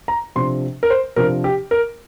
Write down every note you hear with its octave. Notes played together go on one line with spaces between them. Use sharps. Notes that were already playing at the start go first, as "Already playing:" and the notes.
A#5
C3 F3 D4 C6
A#4
C5
C3 F3 D4 A#4
G4
A#4